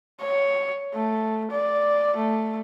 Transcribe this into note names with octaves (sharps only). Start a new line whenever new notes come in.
C#5
A3
D5
A3